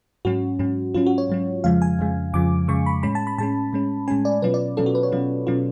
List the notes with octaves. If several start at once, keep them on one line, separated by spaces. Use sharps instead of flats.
G#2 F#3 C#4 F#4
G#2 F#3 C#4
G#2 F#3 C#4 F4
F#4
C#5
G#2 F#3 C#4
F2 C#3 F3 G#3 F5
G#5
F2 C#3 F3 G#3
F2 C#3 F3 G#3 D6
F2 C#3 F3 G#3 C#6
B5
A2 G#3 C#4 B5
A5
B5
A2 G#3 C#4 A5
A2 G#3 C#4
A2 G#3 C#4 G#5
D5
B2 F#3 C#4 F4 B4
D5
B2 F#3 C#4 F4 A4
F#4
B4
C#5
B2 F#3 C#4 F4
B2 F#3 C#4 F4